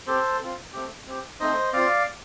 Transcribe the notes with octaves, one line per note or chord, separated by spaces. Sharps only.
C4 G4 A4 C5
C4 F4
A3 C4 G4
C4 G4
A3 C4 D#4 C5 D#5
C4 F4 D5 F5